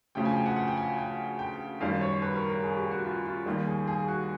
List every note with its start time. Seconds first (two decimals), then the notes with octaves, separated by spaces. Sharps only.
0.15 D2 C#3 F3 G5
0.25 G#5
0.35 G5
0.46 F#5
0.56 F#5
0.67 G5
0.77 G#5
0.98 G5
1.39 G5
1.80 F#2 D#3 G3 F5
2.01 C#5
2.22 B4
2.36 A#4
2.50 A#4
2.63 G#4
2.77 G4
2.91 F#4
3.05 F4
3.25 F4
3.46 D#2 D#3 G3
3.67 G#4
3.87 G#4
4.08 F#4